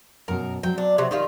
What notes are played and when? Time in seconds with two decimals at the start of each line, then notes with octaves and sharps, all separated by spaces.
0.28 F#2 B2 A#4
0.63 F#3 C4 G5
0.78 D4
0.98 C3 F#3 F#5
1.11 D#3 G3 D#4 F4